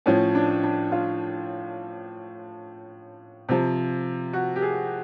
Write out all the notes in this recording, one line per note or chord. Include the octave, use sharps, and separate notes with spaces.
A2 F3 C#4
D4
D4
F4
C3 F3
F#4
G4
G#4